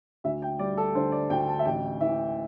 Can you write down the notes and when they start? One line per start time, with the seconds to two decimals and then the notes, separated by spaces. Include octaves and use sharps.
0.24 D2 E5
0.42 G5
0.59 G3 D5
0.77 A4
0.95 D3 C5
1.12 D5
1.30 D2 G5
1.48 A5
1.59 E5
1.65 A1 G5
2.01 E3 E5